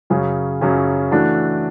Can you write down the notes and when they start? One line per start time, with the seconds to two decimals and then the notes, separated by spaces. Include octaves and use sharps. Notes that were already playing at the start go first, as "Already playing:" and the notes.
0.10 F#2 C#3 F#3 C#4 G#4
0.61 F#2 C#3 F#3 C#4 G#4
1.11 E3 A3 D4 F#4